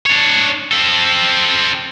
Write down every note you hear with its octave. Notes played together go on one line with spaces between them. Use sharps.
D4 C#5
C4 A4